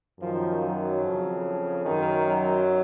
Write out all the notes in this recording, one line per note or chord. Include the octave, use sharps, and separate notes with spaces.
F#2 D#3 F3
F#3
F2 C#3
F#2 D#3
F#3